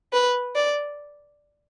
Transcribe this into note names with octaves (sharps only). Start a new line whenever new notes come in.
B4
D5